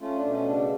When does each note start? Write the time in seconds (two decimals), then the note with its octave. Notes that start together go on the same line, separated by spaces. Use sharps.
0.01 A3 C#4 F4
0.16 D4
0.23 B2
0.31 C#4
0.46 C#3 D4